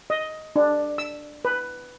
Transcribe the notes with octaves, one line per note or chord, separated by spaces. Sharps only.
D#5
D4
E6
B4